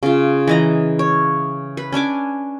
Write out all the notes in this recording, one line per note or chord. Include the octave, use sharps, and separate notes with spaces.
C#3 F4
E3 D#5 A#5
C#5
B4
C#4 D4 G#5 D6